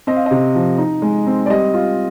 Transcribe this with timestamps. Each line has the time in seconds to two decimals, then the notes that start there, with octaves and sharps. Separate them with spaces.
0.07 C4 D#5
0.16 F5
0.26 C3 D#5
0.55 F3
0.78 D#4
1.02 G#3
1.27 C4
1.46 D5
1.50 G3 D#5
1.74 F4